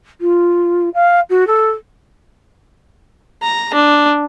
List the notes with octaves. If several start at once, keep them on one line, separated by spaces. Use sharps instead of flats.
F4
F5
F#4
A4
A#5
D4